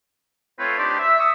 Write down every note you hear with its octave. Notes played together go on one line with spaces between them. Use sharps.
A3 C4 F4 B4 C#5
D4 D#4 G4 C5 D5 C6
E5
C#6 D#6 E6